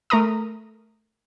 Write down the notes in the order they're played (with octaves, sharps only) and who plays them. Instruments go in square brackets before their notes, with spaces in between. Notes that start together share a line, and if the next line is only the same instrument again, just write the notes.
[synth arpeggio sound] A3 A#4 A#5 D#6